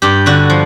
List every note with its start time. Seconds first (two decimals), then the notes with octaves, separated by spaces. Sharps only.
0.02 G2 G4
0.26 D3 F#4
0.50 F3